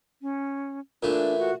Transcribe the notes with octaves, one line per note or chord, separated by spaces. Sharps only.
C#4
A#2 E3 A3 D4
F#4